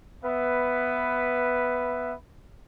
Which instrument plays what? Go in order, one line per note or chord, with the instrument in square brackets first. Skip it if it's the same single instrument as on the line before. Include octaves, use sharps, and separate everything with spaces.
[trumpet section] B3 B4 E5